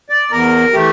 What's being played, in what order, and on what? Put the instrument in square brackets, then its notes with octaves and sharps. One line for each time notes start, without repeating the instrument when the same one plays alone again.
[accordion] D5
E2 A#4
E3 A3 G4